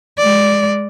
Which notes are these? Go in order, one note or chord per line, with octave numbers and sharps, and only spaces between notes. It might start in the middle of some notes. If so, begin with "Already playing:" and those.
G#3 D5